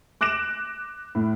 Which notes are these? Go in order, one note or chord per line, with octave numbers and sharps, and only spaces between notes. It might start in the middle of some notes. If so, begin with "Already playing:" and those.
D6 F#6 A#6 D7 E7
A2